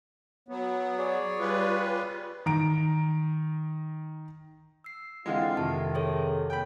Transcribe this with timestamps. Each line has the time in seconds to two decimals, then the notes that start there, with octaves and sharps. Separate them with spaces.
0.49 F#3 B3
0.98 G#4 C#5 D5
1.39 G3 F4 B4
2.46 D#3 A#5 D7
4.84 E6 C7
5.26 D3 E3 G#3 C4 F4 F5
5.57 F2 C3 D#3 A5
5.95 G#4 A4 C#5
6.50 G5 B5